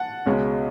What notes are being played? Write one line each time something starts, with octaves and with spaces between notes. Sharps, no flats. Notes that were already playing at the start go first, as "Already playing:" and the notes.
Already playing: F#5 A5
C#2 B2 G#3 C#4